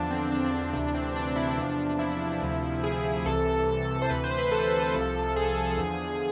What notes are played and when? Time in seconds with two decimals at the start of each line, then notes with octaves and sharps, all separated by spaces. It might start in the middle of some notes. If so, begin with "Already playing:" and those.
Already playing: E2 D3 F3 D4
0.11 C4
0.32 D4
0.46 D4
0.60 D4
0.73 D2 C3 E3 D4
0.88 D4
0.95 C4
1.16 D4
1.36 E4
1.57 E2 C3 F3 D4
1.72 D4
1.99 E4
2.42 D2 C3 F3
2.84 G#4
3.26 C2 C3 E3 A4
4.02 C5
4.10 D2 C3 E3 B4
4.24 C5
4.38 B4
4.52 A4
4.95 C2 C3 F3
5.36 G#4
5.78 E2 D3 F3